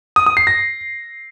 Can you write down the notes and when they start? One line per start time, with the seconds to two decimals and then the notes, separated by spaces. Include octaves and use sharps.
0.16 D#6
0.26 D#6
0.37 C7
0.47 A#6